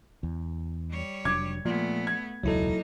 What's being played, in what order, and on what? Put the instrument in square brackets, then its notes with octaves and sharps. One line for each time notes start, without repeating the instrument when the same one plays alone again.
[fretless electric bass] E2
[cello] G3 C#5
[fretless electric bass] F1 F#3 D4 [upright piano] D6 G#6
[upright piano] A#2 [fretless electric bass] F3 [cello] A3 B3
[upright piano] G#6
[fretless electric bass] E1 C#2 [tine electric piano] F#3 E4 A4 [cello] A#3 D#4